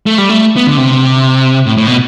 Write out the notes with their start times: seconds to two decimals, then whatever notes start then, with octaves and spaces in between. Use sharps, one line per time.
0.06 A3
0.18 G3
0.29 A3
0.57 B3
0.67 D3
0.77 C3
1.66 A2
1.77 A2
1.87 B2